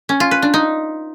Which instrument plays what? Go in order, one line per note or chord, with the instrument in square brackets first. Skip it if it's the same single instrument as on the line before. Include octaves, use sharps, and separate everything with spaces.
[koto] C#4
F4
B4
D4
D#4